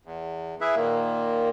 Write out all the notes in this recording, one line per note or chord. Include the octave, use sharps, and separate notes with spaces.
E2
E4 G#4 B4 E5
A#2 D#3 A#3